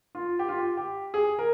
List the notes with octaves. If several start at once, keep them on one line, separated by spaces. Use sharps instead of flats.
F4
G4
F4
G4
G4
G#4
A#4